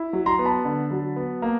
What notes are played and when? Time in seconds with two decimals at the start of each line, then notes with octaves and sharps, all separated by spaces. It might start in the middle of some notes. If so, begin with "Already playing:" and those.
Already playing: E4
0.13 F#3
0.26 A#5 C6
0.39 B3
0.45 A5 B5
0.65 D3
0.91 F#3
1.16 B3
1.42 A#3